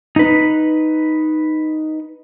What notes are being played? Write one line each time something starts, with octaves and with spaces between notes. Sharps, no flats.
D#4 B4